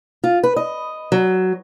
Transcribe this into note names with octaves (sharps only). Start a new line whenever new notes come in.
F4
B4
D#5
F#3